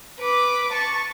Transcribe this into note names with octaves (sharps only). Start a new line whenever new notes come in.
B4 D6
A5 C#6